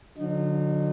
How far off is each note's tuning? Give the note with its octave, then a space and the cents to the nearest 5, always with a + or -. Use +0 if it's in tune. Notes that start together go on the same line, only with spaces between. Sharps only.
D3 -5 F#3 -35 D#4 -30